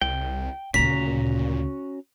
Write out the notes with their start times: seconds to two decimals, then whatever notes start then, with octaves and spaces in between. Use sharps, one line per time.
0.01 C2 G5
0.74 D2 A#2 C#3 C#4 F#4 A#5 B6